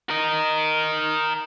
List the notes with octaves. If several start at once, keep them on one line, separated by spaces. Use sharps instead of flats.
A#4 D#5